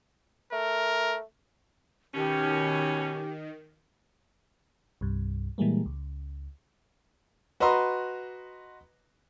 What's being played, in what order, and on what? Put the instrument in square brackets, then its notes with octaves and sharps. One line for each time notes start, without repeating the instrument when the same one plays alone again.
[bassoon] A3 [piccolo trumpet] A#4
[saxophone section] B2 C#4 [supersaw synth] D#3 [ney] G4
[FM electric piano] C2 G2
A#2 E3 G3 G#3 A#3
C#2
[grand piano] F#4 B4 D#5 A#5 C6